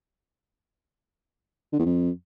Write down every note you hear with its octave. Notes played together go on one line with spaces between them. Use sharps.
D3
E2
F2